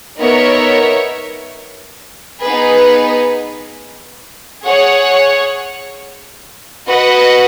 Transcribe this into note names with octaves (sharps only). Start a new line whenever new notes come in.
B3 D#4 A#4 C#5 E5
B3 D#4 G#4 B4
G#4 C#5 F#5
F#4 B4 D#5 F#5